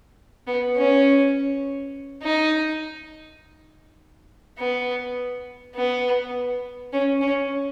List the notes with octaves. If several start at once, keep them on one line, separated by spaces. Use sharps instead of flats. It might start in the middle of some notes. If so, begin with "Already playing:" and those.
B3
C#4
D#4
B3
B3
C#4
C#4